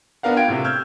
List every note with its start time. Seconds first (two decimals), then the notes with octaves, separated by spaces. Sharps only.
0.23 B3 D4 A#4 F5 F#5
0.36 F4 F5 G5 G#6 D7
0.48 A2 C3
0.64 E6 F6 G6 G#6